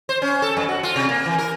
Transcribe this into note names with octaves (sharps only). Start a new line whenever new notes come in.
C5
C#4
A4
F#2
F#4
F4
C3
A#3
E3
A#4